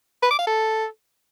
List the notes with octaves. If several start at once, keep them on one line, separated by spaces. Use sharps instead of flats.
B4
D6
F5
A4